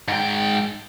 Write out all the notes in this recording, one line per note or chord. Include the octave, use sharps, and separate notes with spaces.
G#2 G5